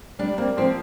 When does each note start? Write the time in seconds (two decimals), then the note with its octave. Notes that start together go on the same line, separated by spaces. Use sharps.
0.19 G3 D4
0.38 A#3 C4
0.57 F3 C4